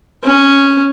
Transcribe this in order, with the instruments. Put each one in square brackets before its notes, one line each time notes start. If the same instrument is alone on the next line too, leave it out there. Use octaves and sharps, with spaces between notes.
[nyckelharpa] C#4